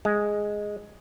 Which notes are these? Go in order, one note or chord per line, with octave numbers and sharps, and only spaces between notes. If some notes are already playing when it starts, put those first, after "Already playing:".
G#3